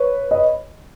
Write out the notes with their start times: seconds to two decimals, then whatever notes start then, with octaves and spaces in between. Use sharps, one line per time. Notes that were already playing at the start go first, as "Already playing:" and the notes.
Already playing: B4 C#5
0.31 D#5